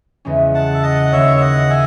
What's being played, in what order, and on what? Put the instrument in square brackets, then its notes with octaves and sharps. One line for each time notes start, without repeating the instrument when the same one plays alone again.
[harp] E2 C#3 G#3 C#4
[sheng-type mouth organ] F#5 A5
E5
D#5 F#5
F#5
[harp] D#2 C#3 G#3 C#4 [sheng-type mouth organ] C#5 E5
[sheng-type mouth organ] E5
D#5 F#5
E5 G#5